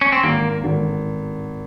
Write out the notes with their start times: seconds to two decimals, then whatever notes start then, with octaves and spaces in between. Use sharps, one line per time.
0.01 C#4
0.12 C4
0.23 G#1 A#3
0.64 G#1